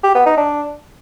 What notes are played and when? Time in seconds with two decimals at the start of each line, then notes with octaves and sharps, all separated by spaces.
0.03 G4
0.15 B3
0.26 D#4
0.37 D4